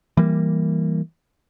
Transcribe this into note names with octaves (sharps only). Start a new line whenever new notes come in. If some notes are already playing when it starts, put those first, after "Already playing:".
E3 G3 A#3